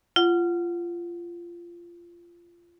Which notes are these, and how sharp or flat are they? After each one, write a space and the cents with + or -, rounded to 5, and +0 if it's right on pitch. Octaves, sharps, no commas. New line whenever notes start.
F4 -20 F#5 +0